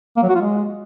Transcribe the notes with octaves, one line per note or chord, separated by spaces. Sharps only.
A#3
F#3
F#4
F4
G#3